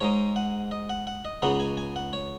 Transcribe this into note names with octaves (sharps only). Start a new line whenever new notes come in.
G#2 G#3 D#4 C#5
F#5
D#5
F#5
F#5
D#5
C#2 C#3 B3 D#4 F#5
G#5
G#5
F#5
C#5